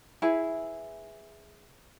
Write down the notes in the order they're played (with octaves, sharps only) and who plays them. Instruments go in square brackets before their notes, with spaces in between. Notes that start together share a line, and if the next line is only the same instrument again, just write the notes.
[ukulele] E4 G#4 B4